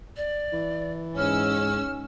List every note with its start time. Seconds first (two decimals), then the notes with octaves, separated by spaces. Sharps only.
0.17 D5
0.53 E3
1.17 G#2 C#4 E6 F6